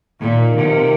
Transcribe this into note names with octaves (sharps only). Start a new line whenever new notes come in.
A#2 D#3
A#3 F4
C3 D#3
A#3 F4